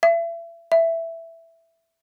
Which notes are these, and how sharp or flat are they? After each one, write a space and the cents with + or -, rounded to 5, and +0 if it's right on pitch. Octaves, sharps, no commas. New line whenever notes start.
E5 +35
E5 +5